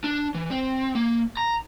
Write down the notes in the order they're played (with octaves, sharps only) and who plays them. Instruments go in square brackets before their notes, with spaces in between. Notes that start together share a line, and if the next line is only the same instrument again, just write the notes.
[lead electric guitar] D4
E3
C4
A#3
A#5